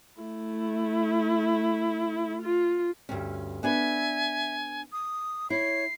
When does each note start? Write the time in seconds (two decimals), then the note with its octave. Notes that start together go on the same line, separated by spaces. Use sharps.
0.21 A3 E4
2.41 F4
3.09 D2 G2 C#4
3.63 B3 D4 B4 E5 G#5
4.92 D#6
5.50 E4 C#5 C7